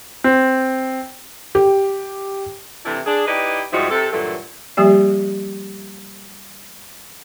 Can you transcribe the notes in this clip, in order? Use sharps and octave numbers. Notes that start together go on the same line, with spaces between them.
C4
G4
C3 E3 A3 D4 E4
D4 G#4
D#4 E4 G4 B4 D5 D#5
G#2 F3 G3 D#4 E4 F#4
C3 A4
G2 A#2 E3 F#3 A4
F3 G3 A#3 G4 D5